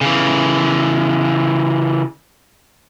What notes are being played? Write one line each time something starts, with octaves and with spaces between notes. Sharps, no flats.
C#3 E3